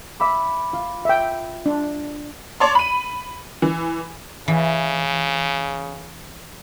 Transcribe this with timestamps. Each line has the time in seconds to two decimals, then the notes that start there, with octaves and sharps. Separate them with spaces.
0.20 E5 B5 D6
0.73 F4
1.05 E5 G5
1.66 D4
2.60 C#5 D5 A5 C6
2.75 B5 D#7
3.62 E3
4.48 C#3 E3